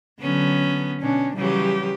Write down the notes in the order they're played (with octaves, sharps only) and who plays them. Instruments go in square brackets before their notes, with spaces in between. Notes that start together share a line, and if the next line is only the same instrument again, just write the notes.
[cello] D3 F#3 [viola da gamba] B3 C#4
[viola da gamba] B2 [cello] C#4 D4
[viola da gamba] C#3 E3 F#3 [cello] G3 G4